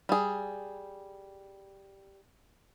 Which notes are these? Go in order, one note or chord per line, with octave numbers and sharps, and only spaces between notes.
G3 G#4